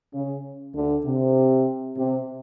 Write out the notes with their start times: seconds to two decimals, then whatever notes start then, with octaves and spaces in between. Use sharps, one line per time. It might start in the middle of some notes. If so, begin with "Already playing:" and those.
0.14 C#3
0.75 D2 D3
1.06 C3
1.97 C3